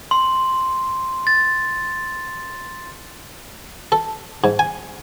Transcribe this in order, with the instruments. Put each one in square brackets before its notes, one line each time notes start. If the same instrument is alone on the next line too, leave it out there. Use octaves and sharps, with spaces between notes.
[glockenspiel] C6
A6
[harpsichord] A4
G#2
G#5